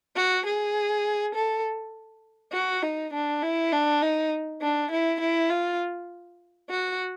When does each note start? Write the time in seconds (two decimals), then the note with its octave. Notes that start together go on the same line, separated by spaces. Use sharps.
0.16 F#4
0.45 G#4
1.35 A4
2.53 F#4
2.83 D#4
3.13 D4
3.43 E4
3.72 D4
4.02 D#4
4.62 D4
4.91 E4
5.20 E4
5.50 F4
6.70 F#4